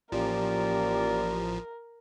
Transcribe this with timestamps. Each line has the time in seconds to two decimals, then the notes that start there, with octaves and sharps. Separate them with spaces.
0.12 A1 F3 A#3 C#4 G4 A#4 D5